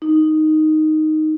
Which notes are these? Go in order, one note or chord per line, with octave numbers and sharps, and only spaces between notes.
D#4